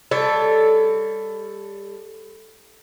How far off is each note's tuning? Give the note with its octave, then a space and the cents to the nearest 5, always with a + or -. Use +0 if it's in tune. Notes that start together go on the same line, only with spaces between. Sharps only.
G3 +30 A4 +0 C#5 +35